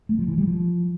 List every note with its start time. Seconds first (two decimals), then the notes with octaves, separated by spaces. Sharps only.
0.09 A3
0.19 F3
0.28 E3
0.38 G3
0.47 F3